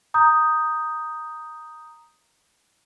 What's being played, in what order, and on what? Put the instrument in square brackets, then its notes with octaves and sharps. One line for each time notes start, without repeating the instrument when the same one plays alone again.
[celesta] A#5 D#6 G6